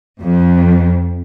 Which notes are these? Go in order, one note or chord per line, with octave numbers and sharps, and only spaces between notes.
F2